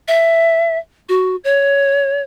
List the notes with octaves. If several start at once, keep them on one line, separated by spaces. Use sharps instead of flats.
E5
F#4
C#5